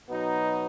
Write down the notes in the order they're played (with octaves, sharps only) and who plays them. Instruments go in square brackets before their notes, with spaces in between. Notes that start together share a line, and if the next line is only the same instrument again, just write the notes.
[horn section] B2 F#3 B3 D#4